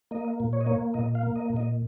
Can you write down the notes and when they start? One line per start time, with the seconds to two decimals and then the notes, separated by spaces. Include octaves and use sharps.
0.11 A#3 D#5
0.40 A#2
0.53 C#5
0.61 D#5
0.67 A#3 C#5
0.94 A#2 D#5
1.15 F5
1.23 A#3
1.36 D#5
1.50 A#2
1.56 D#5